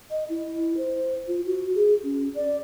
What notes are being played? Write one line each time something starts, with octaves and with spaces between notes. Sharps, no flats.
D#5
E4
C5
F4
F#4
G#4
C#4
D5